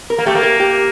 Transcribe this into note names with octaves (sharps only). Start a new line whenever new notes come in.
A#4
A#3
A3 G4
A#3
A#4
G4